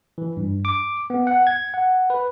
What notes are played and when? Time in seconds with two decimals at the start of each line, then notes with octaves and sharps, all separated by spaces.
0.18 E3
0.37 G2
0.65 D6
1.10 B3
1.27 F#5
1.47 G#6
1.74 F#5
2.10 B4